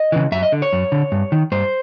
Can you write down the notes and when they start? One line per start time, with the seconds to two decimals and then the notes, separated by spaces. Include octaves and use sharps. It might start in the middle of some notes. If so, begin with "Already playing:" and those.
Already playing: D#5
0.12 C#3 E3
0.32 F#2 E5
0.43 D#5
0.52 D3
0.62 C#5
0.73 F#2
0.92 D3
1.12 G2
1.32 D#3
1.52 G2 C5